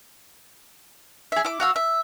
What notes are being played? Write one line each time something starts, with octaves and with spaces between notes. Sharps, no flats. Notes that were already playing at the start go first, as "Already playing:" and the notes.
G#4 E5
E4 D6
F#4 F5 E6
E5